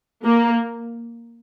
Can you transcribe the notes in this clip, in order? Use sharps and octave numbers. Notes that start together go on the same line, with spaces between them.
A#3